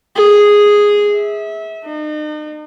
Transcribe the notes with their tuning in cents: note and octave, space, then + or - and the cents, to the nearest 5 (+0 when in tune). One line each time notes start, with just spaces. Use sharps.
G#4 -5
E5 -25
D#4 -40